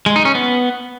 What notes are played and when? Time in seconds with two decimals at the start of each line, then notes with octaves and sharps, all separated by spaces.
0.06 G#3
0.16 D#4
0.25 C#4
0.35 B3